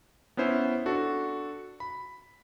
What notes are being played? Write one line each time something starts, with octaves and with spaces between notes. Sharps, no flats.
B3 C#4 E4 C5 E5
D4 F#4 A4
B5